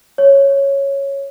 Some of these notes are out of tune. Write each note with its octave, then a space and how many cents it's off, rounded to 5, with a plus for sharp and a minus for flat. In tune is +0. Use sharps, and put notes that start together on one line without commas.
C#5 -5